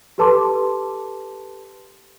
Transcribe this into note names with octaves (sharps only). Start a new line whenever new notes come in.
G4 A4 B4 A5 C6 D6